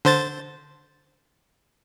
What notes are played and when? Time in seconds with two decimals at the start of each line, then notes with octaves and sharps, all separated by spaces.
0.05 D3 C5 A6